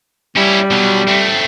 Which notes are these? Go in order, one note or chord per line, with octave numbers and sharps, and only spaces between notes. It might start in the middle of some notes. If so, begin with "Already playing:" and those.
G3 C#4 E4
B2 F#3
A3 C4